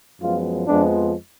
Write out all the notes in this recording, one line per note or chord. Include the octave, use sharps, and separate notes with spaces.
F#2 F3 G#3 B3 F4
F2 F3 G#3 B3 D4